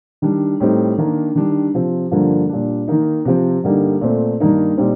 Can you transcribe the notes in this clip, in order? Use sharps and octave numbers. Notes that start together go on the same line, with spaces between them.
D#3 G3 D4
A2 G3 C4 D#4
D#3 A#3 D4
D#3 G3 D4
C3 F3 C4
G2 D3 F3 A#3
A#2 G3 D4
D#3 A#3 D#4
C3 F3 C4
G2 D3 G3 A#3 D#4
A#2 A3 C4
G2 D#3 A#3 D#4
A#2 G3 C4 D#4